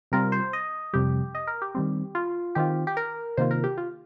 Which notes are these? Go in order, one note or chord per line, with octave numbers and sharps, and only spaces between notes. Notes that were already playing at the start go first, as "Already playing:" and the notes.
C3 G3 C4 F4 A#4
C5
D#5
F2 C3 G3 G4
D#5
A#4
G4
D#3 G3 C4
F4
D#3 C4 F4 G4
G4
A#4
C3 D#3 A#3 F4 C5
A#4
G4
F4